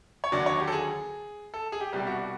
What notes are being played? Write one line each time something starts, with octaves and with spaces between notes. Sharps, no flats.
C#5
D#2 D3 F#3 D5
C#5
G4
A4
G#4
A4
G#4
G4
C2 B2 G3 G4
F#4
F#4